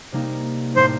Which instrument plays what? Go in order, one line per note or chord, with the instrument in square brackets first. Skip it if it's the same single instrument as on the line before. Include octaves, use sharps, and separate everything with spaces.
[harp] C3 G3 A#3 D#4
[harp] A2 G3 A#3 D#4 [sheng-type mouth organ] C5